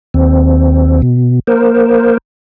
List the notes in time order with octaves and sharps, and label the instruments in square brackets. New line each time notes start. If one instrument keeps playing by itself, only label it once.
[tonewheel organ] D#2 C4
B2
A#3 A#4 C5